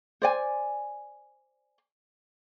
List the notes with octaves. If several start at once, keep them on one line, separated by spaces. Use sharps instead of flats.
C5 D5 G#5